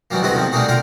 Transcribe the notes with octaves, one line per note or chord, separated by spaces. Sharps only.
D#3 E3 F#3 G3 A#3
D2 G2 C3 E4 F#4 D#5
D#3 F3 C4
G3 A3 A#3 D#4 F#4 G#4
D3 F4 A#4 G5